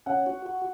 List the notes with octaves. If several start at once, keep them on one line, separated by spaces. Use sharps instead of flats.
C#4 F#5
F#4
F#4